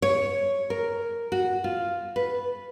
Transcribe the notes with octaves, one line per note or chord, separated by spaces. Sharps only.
C#5
A#4
F#4
F4
B4